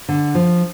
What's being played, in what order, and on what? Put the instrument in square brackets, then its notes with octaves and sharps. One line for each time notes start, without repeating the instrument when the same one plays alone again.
[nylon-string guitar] D3
F3